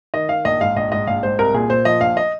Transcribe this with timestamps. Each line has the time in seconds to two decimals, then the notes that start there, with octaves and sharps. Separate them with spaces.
0.14 D#3 D#5
0.29 D#3 F5
0.45 A#1 D#5
0.61 G#2 F5
0.76 A#1 D#5
0.91 G#2 D#5
1.07 A#1 F5
1.23 G#2 C5
1.38 C2 A#4
1.54 A#2 G#4
1.70 A#2 C5
1.85 F3 D#5
2.01 A#1 F5
2.17 D#5